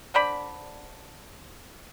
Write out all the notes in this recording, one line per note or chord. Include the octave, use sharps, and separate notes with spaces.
D3 C5 D5 B5